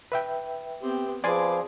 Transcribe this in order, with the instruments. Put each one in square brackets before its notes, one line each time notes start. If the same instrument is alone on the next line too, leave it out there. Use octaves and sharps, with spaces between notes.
[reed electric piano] B4 E5 G5
[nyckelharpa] B3 C4 [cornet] G4
[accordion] F3 [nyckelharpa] G#4 D6 [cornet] B4 [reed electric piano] D5 G#5 C6